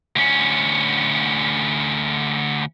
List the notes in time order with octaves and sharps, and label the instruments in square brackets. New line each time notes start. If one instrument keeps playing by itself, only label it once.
[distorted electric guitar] D2 C#4